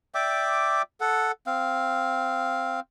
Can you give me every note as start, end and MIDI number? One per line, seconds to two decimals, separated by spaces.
0.15 0.82 74
0.15 0.82 76
0.15 0.82 79
0.15 0.82 86
1.01 1.32 69
1.01 1.32 78
1.47 2.80 60
1.47 2.80 77